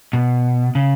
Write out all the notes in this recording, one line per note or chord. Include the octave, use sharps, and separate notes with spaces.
B2
C#3